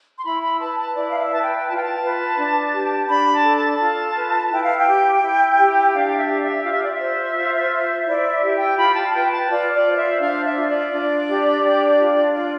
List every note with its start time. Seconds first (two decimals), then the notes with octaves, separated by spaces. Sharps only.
0.17 C6
0.24 E4 B5
0.41 B5
0.59 B4 A5
0.78 A5
0.95 E4 D5
1.08 F5
1.18 E5
1.30 B4 A5
1.43 G5
1.67 F4 A5
1.74 G5
1.82 A5
2.02 B4
2.38 D4
2.73 G4
3.08 D4 B5
3.33 A5
3.44 A4
3.56 A5
3.80 F4
4.15 B4
4.50 E4 G5
4.63 F5
4.76 G5
4.87 G4
5.22 E4
5.58 G4
5.93 D4 F5
6.16 E5
6.28 G4
6.41 E5
6.64 F4 F5
6.73 E5
6.83 D5
6.93 E5
7.00 C5
7.36 F4
7.71 C5
8.06 E4 D5
8.30 E5
8.42 G4
8.54 G5
8.77 F4 B5
8.95 A5
9.13 B4 G5
9.31 A5
9.49 F4 D5
9.73 D5
9.85 C5
9.96 E5
10.19 D4 F5
10.43 E5
10.55 F4
10.68 D5
10.91 D4
11.27 G4
11.62 D4
11.98 F4
12.33 D4 D5